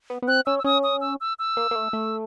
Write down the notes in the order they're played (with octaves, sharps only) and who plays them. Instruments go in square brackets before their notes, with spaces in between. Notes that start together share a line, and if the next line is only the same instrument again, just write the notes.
[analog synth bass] B3
B3
[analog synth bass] C4 [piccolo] F#6
[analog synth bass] C#4 [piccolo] E6
[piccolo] E6
[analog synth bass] C#4 [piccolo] D#6
[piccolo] D#6
E6
E6
E6
[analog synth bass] A#3
A#3
A3
A3